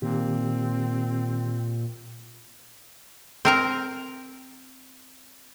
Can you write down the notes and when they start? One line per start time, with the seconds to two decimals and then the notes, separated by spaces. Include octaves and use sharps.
0.02 A#2 D#3 C4 G4
3.45 C4 A#4 A#5